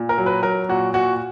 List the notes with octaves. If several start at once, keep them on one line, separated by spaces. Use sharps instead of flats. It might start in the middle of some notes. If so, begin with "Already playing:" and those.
Already playing: A#2
A#4
F#3
B4
F#3 A#4
A#2 F#4
A#2 F#4